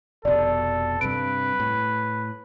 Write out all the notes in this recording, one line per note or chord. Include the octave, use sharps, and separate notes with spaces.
F1 B2 A4 D5
G2 C3 B4 D7
A2